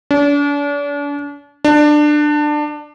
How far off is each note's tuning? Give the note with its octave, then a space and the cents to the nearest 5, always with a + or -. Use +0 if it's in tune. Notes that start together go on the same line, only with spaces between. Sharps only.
D4 -40
D4 +20